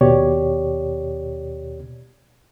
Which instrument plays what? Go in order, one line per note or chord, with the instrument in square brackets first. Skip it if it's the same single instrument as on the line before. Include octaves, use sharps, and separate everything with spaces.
[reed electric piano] D#2 B2 G4 C#5 D5